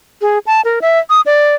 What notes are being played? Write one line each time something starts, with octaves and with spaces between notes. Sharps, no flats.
G#4
A5
A#4
E5
D#6
D5